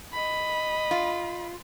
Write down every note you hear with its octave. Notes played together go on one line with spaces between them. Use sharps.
D#5 B5
F4